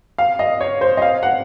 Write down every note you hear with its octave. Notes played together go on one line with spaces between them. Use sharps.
F5
D#5
C#5
C5
D#5
F5
F#5